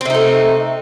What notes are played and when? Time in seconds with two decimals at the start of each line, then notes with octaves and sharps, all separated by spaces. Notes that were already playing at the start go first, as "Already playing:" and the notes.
0.01 C4
0.05 C3
0.10 D#4
0.15 A3